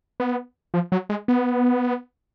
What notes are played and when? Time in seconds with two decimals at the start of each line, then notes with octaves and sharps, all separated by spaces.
0.20 B3
0.74 F3
0.92 F#3
1.09 G#3
1.28 B3